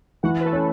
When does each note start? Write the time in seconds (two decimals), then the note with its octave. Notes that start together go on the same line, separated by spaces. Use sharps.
0.23 E3 F#4 F#5
0.40 B4
0.44 A3 A4
0.53 C#4